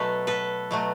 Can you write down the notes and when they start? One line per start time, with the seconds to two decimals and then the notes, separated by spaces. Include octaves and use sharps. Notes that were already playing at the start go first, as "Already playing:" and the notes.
Already playing: B2 F#3 A3 A4 B4
0.27 A4 B4
0.71 B2 F#3 A3